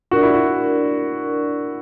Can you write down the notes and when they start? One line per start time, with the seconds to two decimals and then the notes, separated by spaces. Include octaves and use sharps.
0.11 D4 F#4 A#4 D5
0.23 E4
0.34 F#4